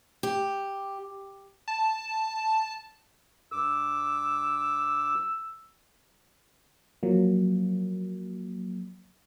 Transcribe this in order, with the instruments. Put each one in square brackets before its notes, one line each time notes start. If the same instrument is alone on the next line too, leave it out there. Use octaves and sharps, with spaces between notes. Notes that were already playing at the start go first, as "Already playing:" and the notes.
[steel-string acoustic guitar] G4
[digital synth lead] A5
[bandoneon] G2 D6 [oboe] E6
[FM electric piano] F3 F#3 A#3